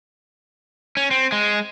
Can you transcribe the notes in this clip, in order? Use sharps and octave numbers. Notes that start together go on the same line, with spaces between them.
C#4
C4
G#3